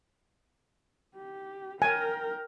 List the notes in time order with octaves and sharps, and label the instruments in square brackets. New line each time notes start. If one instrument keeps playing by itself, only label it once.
[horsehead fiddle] G4
[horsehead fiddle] A#4 G5 [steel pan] G#5